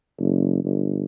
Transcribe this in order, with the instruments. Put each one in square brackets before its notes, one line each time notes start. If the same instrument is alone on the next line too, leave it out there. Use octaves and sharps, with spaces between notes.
[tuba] F#1
G1